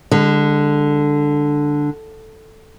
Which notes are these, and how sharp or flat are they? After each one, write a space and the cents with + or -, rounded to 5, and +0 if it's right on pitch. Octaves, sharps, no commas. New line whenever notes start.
D3 +0 G#3 -40